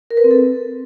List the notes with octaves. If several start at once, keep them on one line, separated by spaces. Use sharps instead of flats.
A#4
B4
C4
A4